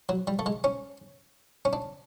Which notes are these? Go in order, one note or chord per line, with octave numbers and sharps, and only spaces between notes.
F#3
G3
A3
G#3
C#4
C#4
D4